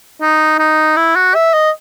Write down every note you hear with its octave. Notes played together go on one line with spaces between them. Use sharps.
D#4
D#4
E4
F#4
E5
D#5